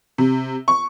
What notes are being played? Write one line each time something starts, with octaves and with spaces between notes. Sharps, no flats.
C3
C#6